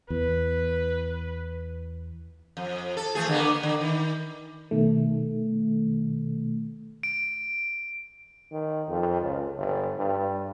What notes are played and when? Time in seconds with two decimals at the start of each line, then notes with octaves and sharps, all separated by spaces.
0.10 E2 B4
2.57 F2
2.97 A4
3.15 E3 A3 G#4
3.28 D3 A#3 B3
3.63 D3
3.81 D#3
4.71 B2 D#3 A3
7.03 D7
8.52 D#3
8.88 F2
9.22 C#2
9.57 G1
9.98 G2